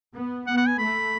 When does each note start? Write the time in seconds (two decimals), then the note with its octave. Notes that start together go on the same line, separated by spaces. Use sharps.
0.13 B3
0.46 B3 F#5
0.57 F#5
0.67 G#5
0.78 A3 B5